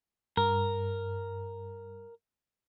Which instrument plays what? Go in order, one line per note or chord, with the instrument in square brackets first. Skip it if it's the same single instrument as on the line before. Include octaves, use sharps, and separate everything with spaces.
[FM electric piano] G2 [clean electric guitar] A#4